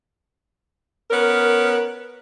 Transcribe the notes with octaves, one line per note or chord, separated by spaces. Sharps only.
B3 C#4 A#4